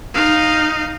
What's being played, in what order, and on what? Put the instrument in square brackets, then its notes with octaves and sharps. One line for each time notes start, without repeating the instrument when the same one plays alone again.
[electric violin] D#4 F5